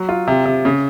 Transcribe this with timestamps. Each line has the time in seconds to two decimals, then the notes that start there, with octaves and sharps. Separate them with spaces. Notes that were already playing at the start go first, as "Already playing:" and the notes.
Already playing: F#3
0.09 F4
0.27 C3
0.45 C3
0.65 C#3